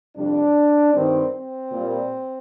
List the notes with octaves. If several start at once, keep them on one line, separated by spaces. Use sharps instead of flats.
F2 C3 G3 D4
G2 D#3 G3 C4
C4
A#2 G3